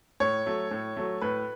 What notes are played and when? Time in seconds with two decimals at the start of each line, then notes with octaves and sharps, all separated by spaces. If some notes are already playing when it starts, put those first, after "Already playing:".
0.20 A2 C#5
0.46 F#3 A3
0.71 A2
0.97 F#3 A3
1.21 A2 B4